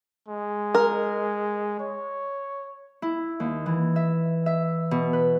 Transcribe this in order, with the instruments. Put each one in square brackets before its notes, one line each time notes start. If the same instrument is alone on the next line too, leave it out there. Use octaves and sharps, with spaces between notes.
[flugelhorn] G#3
[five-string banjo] A#4
[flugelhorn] C#5
[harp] E4
D#2
E3
E5
E5
B2
B4